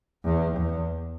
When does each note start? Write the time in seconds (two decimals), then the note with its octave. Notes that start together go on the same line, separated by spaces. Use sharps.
0.24 E2
0.57 E2